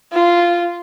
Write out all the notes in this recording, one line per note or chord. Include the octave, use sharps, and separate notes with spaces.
F4